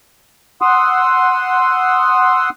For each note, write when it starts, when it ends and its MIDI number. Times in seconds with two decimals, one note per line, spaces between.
0.62 2.50 78
0.62 2.50 84
0.62 2.50 87
0.62 2.50 88